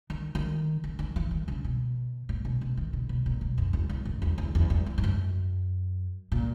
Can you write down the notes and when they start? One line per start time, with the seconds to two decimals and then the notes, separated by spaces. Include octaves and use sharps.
0.10 D#3
0.35 D#3
0.84 C#3
0.99 D#3
1.16 E3
1.31 D#3
1.48 C#3
1.64 B2
2.29 A#2
2.45 B2
2.61 B2
2.77 D#3
2.93 B2
3.09 B2
3.26 A#2
3.41 B2
3.58 F#2
3.73 E2
3.89 E2
4.05 F#2
4.22 E2
4.38 E2
4.55 E2
4.70 E2
4.86 E2
4.98 G#2
5.04 F#2
6.32 A#2